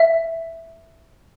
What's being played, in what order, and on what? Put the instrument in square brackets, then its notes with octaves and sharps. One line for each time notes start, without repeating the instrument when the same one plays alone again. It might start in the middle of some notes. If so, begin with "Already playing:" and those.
Already playing: [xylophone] E5